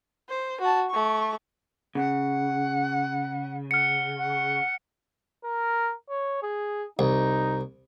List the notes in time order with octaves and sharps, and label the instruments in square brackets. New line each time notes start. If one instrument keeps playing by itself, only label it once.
[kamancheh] C5
F#4 A5
A3 C#6
[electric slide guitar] C#3 [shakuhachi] F#5
[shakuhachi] F#5 [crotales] F6 C#7
[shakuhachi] F#5
[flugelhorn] A#4
C#5
G#4
[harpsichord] C2 [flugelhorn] D#4